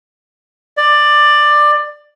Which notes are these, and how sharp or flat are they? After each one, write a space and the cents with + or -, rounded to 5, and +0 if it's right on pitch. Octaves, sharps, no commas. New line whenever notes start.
D5 +15